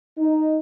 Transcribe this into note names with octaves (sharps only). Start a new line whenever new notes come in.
D#4